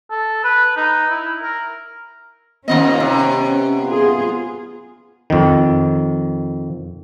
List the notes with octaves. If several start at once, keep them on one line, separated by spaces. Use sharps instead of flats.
A4
B4
D#4
E4
A#4
D#2 F3 B3 C#4 D#5
C3
F4 G#4
F2 D#3